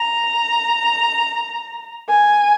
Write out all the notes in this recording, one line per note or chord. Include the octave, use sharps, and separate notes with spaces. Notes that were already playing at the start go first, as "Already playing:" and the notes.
Already playing: A#5
G#5